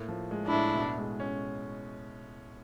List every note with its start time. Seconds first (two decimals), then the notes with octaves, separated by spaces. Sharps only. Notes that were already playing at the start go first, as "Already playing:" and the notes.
Already playing: A2 A#3
0.08 F3
0.31 G#3
0.46 D4 E4
0.52 A2
0.75 B2
0.98 G#3
1.20 C#4